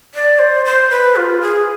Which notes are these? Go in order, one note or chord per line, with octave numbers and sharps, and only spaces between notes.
D5
C5
C5
B4
F4
G#4